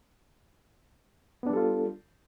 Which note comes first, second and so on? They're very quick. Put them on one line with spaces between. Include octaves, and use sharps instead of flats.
B3 D4 G3 A4 F4